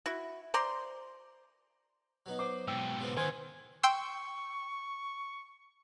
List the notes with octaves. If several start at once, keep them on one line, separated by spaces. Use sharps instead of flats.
E4 F#4
C5 D5 A#5 C6
F#3 B3 D#4
C5 D6
G#2 B2 G5 E6
C#3 B3 C4
D#3 B3 C5 F#5 G#5 C#6
G5 C6 C#6 E6